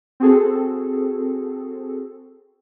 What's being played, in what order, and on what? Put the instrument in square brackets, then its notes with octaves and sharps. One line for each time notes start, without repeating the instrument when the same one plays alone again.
[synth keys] C4 F#4 G#4 A4